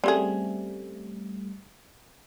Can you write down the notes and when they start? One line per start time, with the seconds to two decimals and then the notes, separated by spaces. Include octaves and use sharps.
0.04 G3 A3 C4 C#4 G#4